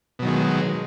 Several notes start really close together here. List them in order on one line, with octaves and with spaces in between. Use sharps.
B2 F#3 D#3 G#3